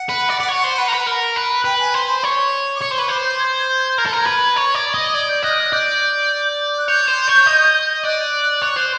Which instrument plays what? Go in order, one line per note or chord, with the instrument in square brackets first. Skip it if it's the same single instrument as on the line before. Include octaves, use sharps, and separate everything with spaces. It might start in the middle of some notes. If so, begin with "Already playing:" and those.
Already playing: [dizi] F#5
[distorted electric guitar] B4
D5
D5
C#5
C5
B4
A#4
B4
A#4
B4
[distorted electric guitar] B4 [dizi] G5
[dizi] G#5
[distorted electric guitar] C5 [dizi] C6
[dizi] B5
[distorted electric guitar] C#5
[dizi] D6
[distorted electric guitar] C#5 [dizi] C#6
[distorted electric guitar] C5
[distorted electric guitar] B4 [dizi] C#6
[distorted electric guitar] C5 [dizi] D6
[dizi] G6
G#6
G6
[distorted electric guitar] A#4 [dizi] G#6
[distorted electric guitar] A4
A#4
B4
C#5
D5
D#5
[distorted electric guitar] D5 [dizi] G#6
[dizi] G6
[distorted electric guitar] D#5 [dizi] F#6
[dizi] F6
F#6
[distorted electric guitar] D5 [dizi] G6
[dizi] F#6
[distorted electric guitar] C#5 [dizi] G6
[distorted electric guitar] C5
C#5
D#5
[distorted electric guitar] D5 [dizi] F#6
[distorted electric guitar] C#5
C5